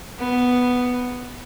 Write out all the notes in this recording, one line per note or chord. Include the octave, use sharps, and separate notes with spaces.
B3